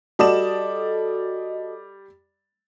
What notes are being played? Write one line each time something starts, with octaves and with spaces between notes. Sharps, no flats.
G3 F#4 A4 D5 D#5 E7